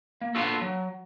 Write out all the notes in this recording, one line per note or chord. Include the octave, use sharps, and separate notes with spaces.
A#3
A#3 B3 D4 F4 F#4 A4
F#3